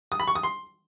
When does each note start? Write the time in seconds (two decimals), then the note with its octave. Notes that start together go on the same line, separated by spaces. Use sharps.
0.12 D#6
0.20 B5
0.28 C#6
0.35 D#6
0.43 C6